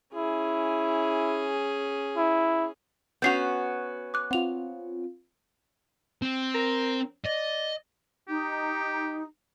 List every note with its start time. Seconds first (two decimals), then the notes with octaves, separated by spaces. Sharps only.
0.15 C#4 E4 G#4
2.17 E4
3.22 B3 C#4 F#4 G6 C7 F7
4.14 D6 F#6
4.31 C4 F4 F#5 F7
6.22 C4
6.54 A#4
7.26 D5 D#5
8.28 D#4 G4